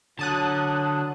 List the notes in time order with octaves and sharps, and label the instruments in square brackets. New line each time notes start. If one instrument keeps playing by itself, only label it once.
[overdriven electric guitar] D3 [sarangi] F#3 [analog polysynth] A5 D#6 F#6